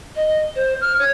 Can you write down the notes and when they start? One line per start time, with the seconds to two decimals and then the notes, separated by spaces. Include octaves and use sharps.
0.15 D#5
0.55 C5
0.81 F6
0.98 C#5